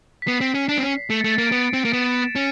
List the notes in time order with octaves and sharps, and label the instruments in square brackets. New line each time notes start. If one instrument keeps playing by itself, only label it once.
[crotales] B6
[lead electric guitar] B3 [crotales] C7
[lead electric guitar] C4
C#4
D4
C4
C#4
[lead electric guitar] A3 [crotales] C#7
[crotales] A6
[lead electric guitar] A3
[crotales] A6
[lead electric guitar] A#3 [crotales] D7
[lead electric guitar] B3
C4
A#3
[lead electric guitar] B3 [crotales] E7
[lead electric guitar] C#4